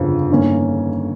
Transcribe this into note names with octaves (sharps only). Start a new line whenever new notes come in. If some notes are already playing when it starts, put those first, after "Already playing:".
Already playing: G1 F2 C#3 F3
G1 G2 D#3 A#3 C#4